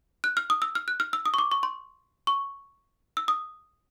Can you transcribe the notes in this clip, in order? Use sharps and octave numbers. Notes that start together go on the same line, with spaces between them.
F#6
F6
D#6
E6
F6
F#6
F6
E6
D#6
C#6
D6
C#6
C6
C#6
E6
D#6